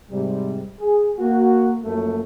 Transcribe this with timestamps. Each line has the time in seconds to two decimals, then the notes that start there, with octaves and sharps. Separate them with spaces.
0.11 G#2 C3 G3
0.80 G#4
1.19 A#3 F#4
1.83 F#2 F3 F#3 A3 A#3